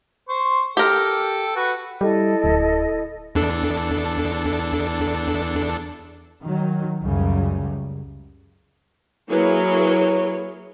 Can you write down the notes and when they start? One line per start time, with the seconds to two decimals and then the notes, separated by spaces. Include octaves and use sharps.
0.29 C5 C#6
0.77 G4 A4 A#4 G5
1.56 F#4 B4
2.01 G3 E4 A4 D#5
2.44 D1
3.35 E2 D4 A4
6.43 D#3 F#3
7.02 C#2 F#2 C#3 G3
9.30 F#3 A#3 E4 G#4 B4 C#5